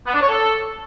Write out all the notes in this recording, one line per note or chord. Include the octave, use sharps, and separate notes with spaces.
B3
D4
C#5
A4